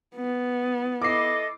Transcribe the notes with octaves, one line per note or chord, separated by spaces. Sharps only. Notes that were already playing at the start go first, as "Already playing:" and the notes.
B3
E4 A4 D#5 D6 C7